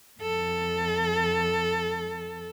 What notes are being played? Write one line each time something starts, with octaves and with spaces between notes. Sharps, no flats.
F2 A4